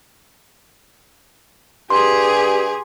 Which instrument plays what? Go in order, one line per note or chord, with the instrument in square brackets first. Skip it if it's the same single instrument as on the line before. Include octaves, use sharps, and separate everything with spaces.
[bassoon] G2 [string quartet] G4 G#4 G#5 [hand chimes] C6